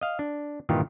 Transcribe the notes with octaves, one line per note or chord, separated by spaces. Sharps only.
D#5 F5
D4
G2 A#2 D#3 E3 F4 G4